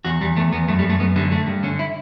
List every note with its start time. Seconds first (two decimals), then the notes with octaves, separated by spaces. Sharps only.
0.05 E2 F#4
0.21 E2 G3
0.36 E2 A3
0.52 E2 B3
0.68 F#2 A3
0.79 G3
0.84 F#2
0.89 A3
1.00 F#2 B3
1.16 D3 G3
1.32 D3 A3
1.47 G2
1.63 D3 C#4
1.79 E4